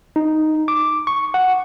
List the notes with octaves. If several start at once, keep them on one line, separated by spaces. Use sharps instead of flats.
D#4
D6
C#6
F#5